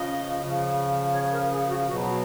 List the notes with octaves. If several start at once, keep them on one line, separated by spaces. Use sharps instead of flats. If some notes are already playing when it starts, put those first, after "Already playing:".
Already playing: C#3 F3 D#5
C#3 F3
C#5
A#4
G#4
F#4
B2 F#3 F#4